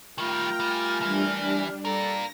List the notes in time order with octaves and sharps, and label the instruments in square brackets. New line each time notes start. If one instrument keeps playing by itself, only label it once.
[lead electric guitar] D#3 G3 [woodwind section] A3 A#4 F6 [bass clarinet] F4 [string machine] G5 A#5
[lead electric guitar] G3 [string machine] G#5
[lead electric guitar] E3 [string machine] G3 D4
[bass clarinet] G3 [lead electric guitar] F4 A#4 [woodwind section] A4 [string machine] A#6